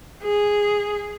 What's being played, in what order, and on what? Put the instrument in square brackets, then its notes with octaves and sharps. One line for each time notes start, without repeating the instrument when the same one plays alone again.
[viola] G#4